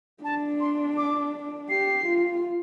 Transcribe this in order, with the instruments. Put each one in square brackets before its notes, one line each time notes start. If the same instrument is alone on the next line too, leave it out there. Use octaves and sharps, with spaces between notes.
[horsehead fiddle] D4 [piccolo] A5
[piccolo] C6
D6
[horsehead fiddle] G4 [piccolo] C7
[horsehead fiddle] F4